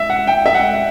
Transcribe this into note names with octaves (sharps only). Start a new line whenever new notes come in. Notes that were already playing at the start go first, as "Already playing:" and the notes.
Already playing: E5
F#5
G5
E5
F#5